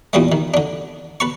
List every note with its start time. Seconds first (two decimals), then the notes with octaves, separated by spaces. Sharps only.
0.13 E2 A#2 G3 G#3
0.32 D#3
0.54 D3 D4
1.20 B4 A5 C#6